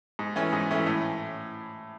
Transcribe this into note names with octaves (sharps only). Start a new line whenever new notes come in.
G#2
E3 A3 C#4
G#2
E3 A3 C#4
A2